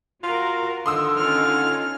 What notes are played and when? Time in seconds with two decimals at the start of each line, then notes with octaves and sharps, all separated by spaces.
0.23 F4 F#4 A#4
0.86 D3 D#3 C6 D#6 E6
1.17 C#4 D#4 F4 C#5 F6